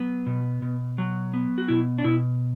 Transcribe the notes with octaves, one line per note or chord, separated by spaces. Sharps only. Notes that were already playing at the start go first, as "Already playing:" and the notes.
Already playing: F#3 B3
B2
B2
F#3
B3
F#4
B2 E4
D4
B2 E4